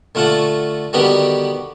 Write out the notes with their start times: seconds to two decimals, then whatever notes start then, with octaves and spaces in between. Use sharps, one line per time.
0.15 D3 A3 F4 F#5 A5 C#6
0.93 D3 D#3 G3 B3 F#4 G4